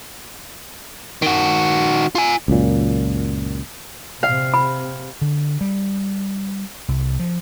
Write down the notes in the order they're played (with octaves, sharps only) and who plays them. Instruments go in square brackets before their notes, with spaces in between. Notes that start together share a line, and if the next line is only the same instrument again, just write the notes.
[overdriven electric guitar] D#3 F#4
F4 G#5
[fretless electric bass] C#2 F#2 A#2
[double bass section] C3 [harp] F5
[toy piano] B5
[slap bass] D3
G3
C2
F3